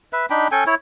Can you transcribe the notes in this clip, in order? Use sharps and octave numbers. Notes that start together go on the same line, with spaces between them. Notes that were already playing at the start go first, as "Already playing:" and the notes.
B4 E5
D4 D#4 G5 B5
C#4 A4 G5 G#5
E4 C#5